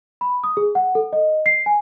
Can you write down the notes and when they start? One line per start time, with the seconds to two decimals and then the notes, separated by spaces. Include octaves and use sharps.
0.21 B5
0.44 D#6
0.57 G#4
0.75 F#5
0.95 A4
1.13 D#5
1.46 C7
1.66 G#5